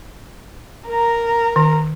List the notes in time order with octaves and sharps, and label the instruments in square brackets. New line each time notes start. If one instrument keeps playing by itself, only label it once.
[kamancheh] A#4 A#5
[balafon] D#3